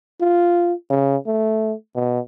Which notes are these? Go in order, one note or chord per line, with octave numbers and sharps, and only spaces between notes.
F4
C#3
A3
B2